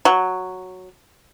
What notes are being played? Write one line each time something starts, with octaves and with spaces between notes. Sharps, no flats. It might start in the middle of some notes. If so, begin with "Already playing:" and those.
F#3